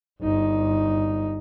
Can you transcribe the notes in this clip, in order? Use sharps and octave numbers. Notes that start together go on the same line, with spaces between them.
G1 D#4